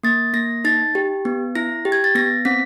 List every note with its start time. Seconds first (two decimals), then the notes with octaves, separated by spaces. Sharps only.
0.04 A#3 A6
0.34 A#3 A#6
0.65 D#4 A6
0.95 G4
1.25 B3
1.55 E4 A#6
1.85 G4
1.92 G#6
2.04 A6
2.15 B3 A#6
2.45 C4 B6